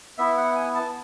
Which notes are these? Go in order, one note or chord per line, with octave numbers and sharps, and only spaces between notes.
B3 E4 E5
F#5
G#5
A5